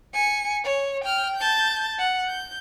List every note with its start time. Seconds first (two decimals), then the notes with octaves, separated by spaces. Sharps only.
0.14 G#5 C#7
0.64 C#5
1.04 G5 F6
1.36 A5 G6
1.99 F#5
2.28 G6